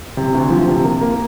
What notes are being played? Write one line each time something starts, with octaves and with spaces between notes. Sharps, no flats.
C3
D2
F3
C3
A#3
A#3